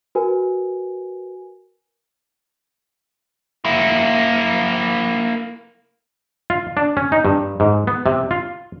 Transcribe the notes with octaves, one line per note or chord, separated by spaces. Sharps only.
F#4 A#4 B4 G#5
A#3 E4
F4
D4
C#4
D#4
G2
G#2
B3
C3
F4